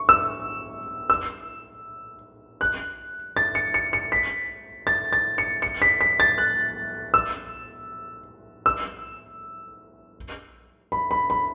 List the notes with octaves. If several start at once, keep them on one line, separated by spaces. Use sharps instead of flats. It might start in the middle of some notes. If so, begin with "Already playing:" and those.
Already playing: C#6
E6
E6
F#6
A6
C#7
C#7
C#7
B6
A6
A6
C#7
C#7
B6
B6
A6
F#6
E6
E6
B5
B5
B5